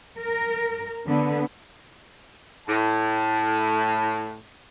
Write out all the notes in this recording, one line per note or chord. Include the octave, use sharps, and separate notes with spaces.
A#4
D3 B3
A2 A5